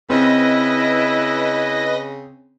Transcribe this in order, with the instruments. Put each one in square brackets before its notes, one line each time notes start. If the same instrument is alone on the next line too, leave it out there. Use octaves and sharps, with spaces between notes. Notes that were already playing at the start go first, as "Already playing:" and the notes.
[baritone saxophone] C#3 [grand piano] C4 [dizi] E4 [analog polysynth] B4 D#5 A#6